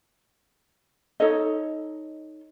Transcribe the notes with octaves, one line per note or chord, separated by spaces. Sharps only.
D#4 A4 C#5 D#5